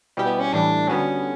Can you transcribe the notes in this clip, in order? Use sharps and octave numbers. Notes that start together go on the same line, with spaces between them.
B2 G3 C#4 E4 G4
B3
C#4
A2 E3 G3 D4
D3 G3 B3 C#4 F#4